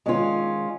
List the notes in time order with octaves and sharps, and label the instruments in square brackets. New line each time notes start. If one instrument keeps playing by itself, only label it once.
[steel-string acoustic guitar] D#3 G#3 C#4 F4